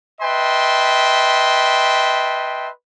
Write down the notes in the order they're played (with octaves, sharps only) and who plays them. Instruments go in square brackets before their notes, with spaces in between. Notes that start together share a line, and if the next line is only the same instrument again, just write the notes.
[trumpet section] B4 D#5 E5 G5 A5 C6